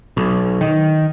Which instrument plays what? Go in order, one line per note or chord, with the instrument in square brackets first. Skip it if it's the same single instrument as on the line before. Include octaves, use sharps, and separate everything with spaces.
[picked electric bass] B1
D#3